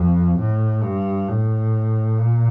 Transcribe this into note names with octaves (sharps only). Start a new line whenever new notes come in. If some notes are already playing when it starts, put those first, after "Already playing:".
Already playing: F2
A2
G2
A2
A#2